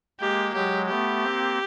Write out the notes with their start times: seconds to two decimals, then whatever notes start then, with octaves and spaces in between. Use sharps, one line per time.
0.20 G#3 A#3 G4
0.54 F#3 G#3 G4
0.88 A3 B3 G4
1.23 A#3 C4